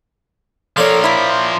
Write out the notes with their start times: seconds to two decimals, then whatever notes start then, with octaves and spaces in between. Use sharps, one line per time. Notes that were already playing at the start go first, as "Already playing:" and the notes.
0.77 F3 A4 A#4 C#5 D5 F5
1.04 A#3 E4 B6
1.30 C6